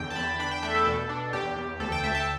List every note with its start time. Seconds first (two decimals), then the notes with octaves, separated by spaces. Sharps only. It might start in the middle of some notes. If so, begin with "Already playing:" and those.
Already playing: E2 D3 G5
0.10 A5
0.16 E2 B5
0.39 D4 B5
0.51 G5
0.63 A3 E5
0.75 A4
0.86 B2 A4
1.09 D4
1.33 E2 G4
1.56 E2
1.80 D2 A4
1.92 G5
2.03 D2 E5
2.15 A5